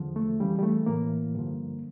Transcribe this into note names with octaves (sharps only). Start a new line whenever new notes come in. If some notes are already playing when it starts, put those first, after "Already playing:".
Already playing: E2 D3 F3
A3
F2 C#3 E3 G3
G3
A3
A2 E3 A#3
G2 D3 F3